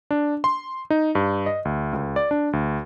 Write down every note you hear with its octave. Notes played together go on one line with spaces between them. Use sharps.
D4
C6
D#4
G2
D#5
D2
C#2
D5
D4
D2